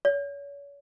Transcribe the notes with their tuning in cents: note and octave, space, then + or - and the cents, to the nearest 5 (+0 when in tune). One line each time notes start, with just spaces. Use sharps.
C#5 +35